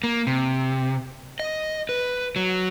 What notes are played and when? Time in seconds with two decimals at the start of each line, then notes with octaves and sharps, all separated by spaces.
0.04 A#3
0.27 C3
1.40 D#5
1.89 B4
2.36 F#3